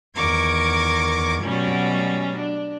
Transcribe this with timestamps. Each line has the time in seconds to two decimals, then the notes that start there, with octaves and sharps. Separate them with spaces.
0.16 E2 D#3 A#4 C#6 D6 G#6
1.44 B2 F#3 G3 A3 C#4
2.37 D4